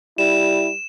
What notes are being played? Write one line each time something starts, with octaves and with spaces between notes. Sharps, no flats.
G3 E4 E7